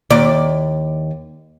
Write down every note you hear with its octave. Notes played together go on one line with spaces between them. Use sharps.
D#2 D5